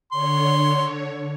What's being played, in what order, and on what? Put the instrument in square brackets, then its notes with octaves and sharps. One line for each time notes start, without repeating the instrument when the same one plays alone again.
[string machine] D3 C#5 [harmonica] C6